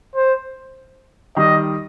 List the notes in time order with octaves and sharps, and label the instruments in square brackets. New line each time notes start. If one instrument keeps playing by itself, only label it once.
[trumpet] C5
[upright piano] D#3 G3 [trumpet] D#5